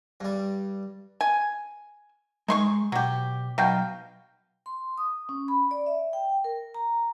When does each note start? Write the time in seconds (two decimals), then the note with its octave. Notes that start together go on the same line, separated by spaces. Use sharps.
0.20 G2 G3
1.21 G#5
2.48 G#3 D#4 C6 C#6
2.92 B2 F#3 G4
3.58 B1 B2 F5 G5 A#5
4.66 C6
4.98 D#6
5.29 C#4
5.48 B5
5.71 D5
5.86 E5
6.13 G5
6.44 A#4
6.75 A#5